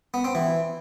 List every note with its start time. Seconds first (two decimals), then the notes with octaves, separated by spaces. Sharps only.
0.14 B3
0.24 C4
0.35 E3